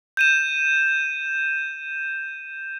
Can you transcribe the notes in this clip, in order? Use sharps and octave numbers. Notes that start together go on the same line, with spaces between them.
G6 D#7 E7